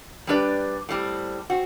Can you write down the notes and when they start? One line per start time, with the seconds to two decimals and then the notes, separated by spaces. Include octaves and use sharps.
0.27 G3 D4 G4 B4 D5
0.89 A2 G3 C4
1.50 C4 F#4